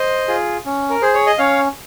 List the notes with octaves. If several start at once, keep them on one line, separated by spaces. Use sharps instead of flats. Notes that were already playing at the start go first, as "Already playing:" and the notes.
Already playing: C5 D#5
F4 G#4
C#4
A#4
G#4 C5
C#5
D#5
C#4 C#5 F5